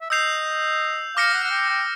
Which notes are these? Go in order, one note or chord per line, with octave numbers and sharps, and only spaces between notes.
E5
D#5 E6 G6 C7 F7
F5 D6 F6 A#6 C#7
F#5
F#5
G5
G5